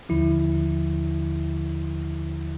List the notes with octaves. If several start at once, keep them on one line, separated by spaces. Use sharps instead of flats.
D#2 D3 F3 E4